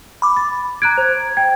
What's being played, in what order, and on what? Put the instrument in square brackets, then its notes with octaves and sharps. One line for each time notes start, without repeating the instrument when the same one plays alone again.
[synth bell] B5 D6
[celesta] A6
[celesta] A#5 F#6 D7 [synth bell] G#6
[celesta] C5
[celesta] G5 [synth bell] G#6